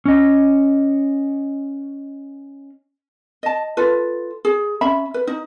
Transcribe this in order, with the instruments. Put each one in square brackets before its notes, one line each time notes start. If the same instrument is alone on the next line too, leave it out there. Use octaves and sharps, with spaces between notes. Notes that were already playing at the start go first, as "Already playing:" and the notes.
[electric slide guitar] C#4 D#5
[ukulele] D#5 A5
F4 A4 B4
G#4
C#4 E5 B5
B4
D#4